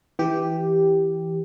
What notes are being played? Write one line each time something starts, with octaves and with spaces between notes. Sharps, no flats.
E3 G4